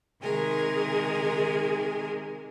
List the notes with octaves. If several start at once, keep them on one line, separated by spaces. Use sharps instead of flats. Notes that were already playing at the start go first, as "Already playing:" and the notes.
C3 D#3 G#3 G#4 A#4